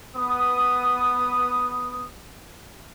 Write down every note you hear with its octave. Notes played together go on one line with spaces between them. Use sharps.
B3 D#6